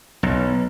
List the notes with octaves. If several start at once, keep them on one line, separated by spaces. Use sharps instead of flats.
B1